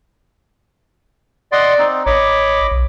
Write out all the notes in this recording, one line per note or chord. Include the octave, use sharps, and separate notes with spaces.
D5 D#5 F#5 C6
C4 D#4
A1 C#5 D#5 B5 D6
B1